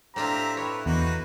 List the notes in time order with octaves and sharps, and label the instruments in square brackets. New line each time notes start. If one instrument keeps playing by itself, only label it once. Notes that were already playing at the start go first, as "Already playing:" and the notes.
[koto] A2 D4 F4 [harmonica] C4 G4 E5 [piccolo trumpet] A#5
[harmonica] E4 [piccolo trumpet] B4 [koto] C#5
[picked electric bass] E2 [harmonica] A#3 D#4 F#4 [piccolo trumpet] B4